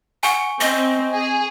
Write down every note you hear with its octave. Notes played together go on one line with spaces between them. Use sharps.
F#5 G#5 C#6
C4 D#5
G#4